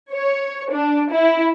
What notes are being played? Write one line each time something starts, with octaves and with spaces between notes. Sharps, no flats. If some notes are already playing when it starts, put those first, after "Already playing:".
C#5
D4
E4